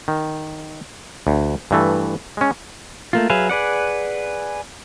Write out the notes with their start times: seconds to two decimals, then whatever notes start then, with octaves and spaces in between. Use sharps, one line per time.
0.08 D#3
1.27 D2
1.71 G2 E3 A3
2.37 G#3 C#4
3.13 A3 A#3 F4
3.30 F#3 G#4 B4 E5 F5
3.50 G#4 B4 D5 F#5